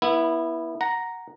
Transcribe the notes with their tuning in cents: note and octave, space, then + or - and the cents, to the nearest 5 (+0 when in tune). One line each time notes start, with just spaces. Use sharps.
B3 -25 E4 +0
F#5 +0 A#5 +0